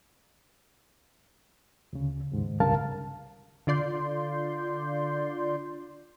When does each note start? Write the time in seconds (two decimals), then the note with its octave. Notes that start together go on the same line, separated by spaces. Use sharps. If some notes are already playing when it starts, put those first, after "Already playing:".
1.93 D2 C#3
2.32 D#2 G#2
2.60 C2 G2 C#3 A#4 F5 A5
3.67 D3 F4 D5 C6 G6